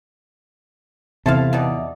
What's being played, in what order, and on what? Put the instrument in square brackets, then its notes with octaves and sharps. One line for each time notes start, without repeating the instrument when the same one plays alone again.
[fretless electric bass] E2 [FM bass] C3 [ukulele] E4 [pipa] A4 C5 F5
[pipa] B2 D#4 D5